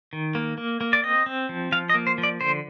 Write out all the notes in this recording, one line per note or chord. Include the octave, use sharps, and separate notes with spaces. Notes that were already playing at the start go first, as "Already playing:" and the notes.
D#3
A#3
A#3
A#3
D5
C4 D#5
C4
F3
F3 F5
D#5
A#3
C5
F3
D5
D3 C5